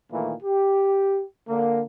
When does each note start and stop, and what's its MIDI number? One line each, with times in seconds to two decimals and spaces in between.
0.11 0.33 46
0.11 0.33 51
0.11 0.33 52
0.11 0.33 57
0.11 0.33 58
0.43 1.22 67
1.48 1.82 50
1.48 1.82 58